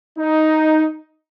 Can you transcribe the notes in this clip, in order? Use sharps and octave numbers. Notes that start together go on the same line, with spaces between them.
D#4